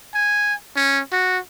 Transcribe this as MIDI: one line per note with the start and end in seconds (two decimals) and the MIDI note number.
0.14 0.54 80
0.76 1.00 61
1.12 1.38 66